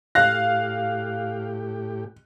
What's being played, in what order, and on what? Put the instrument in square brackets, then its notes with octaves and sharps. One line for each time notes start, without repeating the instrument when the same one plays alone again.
[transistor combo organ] A2 G4 [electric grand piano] F5 A#6 [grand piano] F#6